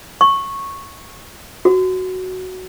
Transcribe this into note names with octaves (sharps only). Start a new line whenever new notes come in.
C#6
F#4